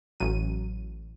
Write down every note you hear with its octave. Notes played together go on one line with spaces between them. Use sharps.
A1 F#3 D#7